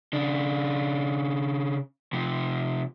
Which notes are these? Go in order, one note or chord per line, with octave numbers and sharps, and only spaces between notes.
C#3 D4
C3 F3